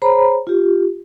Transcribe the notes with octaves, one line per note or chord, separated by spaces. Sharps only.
G#4 C5 C#5 A#5 B5
F4 G4